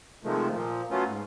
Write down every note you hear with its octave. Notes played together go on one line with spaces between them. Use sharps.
C3 D#3 F3 G#3 A3
A#2 F3
F#3 A3 B3 C#4 F4
G#2